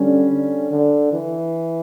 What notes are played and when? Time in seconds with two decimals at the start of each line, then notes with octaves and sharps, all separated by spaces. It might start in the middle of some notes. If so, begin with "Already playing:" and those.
Already playing: D3 G3 C#4
0.30 D3
0.71 D3
1.13 E3